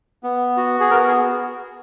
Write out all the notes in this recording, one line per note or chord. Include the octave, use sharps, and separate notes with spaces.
B3
F#4
G#4
B3 A#4
G#4